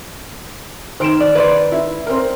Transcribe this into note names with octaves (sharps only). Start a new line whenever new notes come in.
D#3 C5 F6 D7 E7
D5
B4 C5 D5
E4
C4 A#4